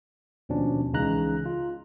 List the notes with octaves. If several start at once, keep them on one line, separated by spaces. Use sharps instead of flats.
D#2 B2 F3 C#4 D4
C#2 C#3 E3 D#4 A#5 F#6
F4